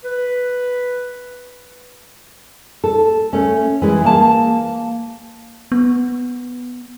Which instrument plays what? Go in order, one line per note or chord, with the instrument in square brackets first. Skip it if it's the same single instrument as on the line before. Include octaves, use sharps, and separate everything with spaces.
[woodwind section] B4
[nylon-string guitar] A4
A3 C#4
E3 G#3 E4
A#3 A5
[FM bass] B3